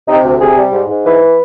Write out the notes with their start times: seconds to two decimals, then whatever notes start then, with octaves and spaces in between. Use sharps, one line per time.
0.08 C3 D#4
0.24 D2
0.40 C3 G#4
0.57 G3
0.72 G#2
0.89 G#2
1.05 E3 B4